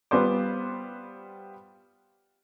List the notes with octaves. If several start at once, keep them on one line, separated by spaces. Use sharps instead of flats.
G3 B3 F4 B4 C5 D6